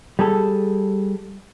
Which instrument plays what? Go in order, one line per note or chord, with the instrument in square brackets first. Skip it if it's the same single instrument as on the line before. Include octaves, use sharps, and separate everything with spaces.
[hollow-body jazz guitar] G3 G#4 A4